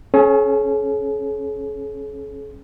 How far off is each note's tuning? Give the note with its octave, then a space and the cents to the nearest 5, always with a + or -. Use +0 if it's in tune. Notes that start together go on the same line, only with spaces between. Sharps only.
C#4 -10 G#4 +45